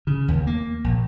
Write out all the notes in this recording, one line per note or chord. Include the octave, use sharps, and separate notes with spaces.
C#3
D#2
A#3
A#1